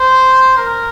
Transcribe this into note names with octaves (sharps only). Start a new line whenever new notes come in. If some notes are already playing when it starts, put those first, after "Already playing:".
Already playing: C5
A#4